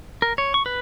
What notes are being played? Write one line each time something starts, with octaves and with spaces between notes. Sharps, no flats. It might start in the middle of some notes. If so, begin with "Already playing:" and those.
A#4
C#5
C#6
B4